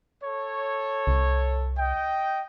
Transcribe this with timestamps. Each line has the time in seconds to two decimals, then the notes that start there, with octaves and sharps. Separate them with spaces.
0.23 A4 C#5
1.07 C2
1.78 D#5 G5